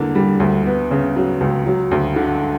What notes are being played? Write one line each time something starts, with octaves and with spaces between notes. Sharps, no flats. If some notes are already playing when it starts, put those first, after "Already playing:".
Already playing: E2 D3 A#3
G3
D2
B3
C#3
F#3
C#2
F#3
D2
D3